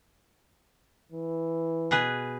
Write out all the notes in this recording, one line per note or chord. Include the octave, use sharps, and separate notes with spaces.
E3
B2 G#4 B4